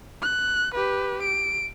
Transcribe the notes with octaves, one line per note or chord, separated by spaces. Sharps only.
F#6
G4 B4
D7